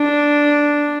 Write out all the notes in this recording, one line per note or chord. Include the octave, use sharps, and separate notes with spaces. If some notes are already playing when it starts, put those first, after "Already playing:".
Already playing: D4